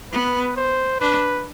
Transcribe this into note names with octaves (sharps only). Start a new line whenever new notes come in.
B3 B4
C5
D4 B4